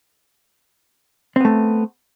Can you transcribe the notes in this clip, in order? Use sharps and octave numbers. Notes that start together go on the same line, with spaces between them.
A3 B3 C4